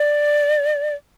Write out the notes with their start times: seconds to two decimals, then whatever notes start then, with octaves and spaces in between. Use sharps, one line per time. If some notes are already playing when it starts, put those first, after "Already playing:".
Already playing: D5